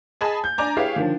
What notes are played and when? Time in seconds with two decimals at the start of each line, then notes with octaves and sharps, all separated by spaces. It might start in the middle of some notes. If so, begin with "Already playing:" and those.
0.21 G#4 D#5 G#5 A5 B5 D#6
0.44 G6
0.58 D4 D5 G#5 A#5 D6
0.77 E4 G4 G#4 B4 C#5 F5
0.96 D3 D#3 F3